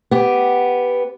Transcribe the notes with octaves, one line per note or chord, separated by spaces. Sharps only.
B3 G4